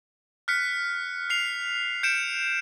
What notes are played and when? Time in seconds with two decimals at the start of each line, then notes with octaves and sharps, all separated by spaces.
0.48 F6 F#6 B6 C#7
1.30 F6 C7 F7
2.03 G6 C#7 D7 E7